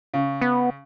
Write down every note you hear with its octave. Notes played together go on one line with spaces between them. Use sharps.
C#3
B3